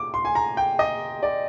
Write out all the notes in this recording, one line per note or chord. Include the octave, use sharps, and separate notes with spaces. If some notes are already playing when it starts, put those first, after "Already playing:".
Already playing: D6
C6
G#5
A#5
G5
D#5
D5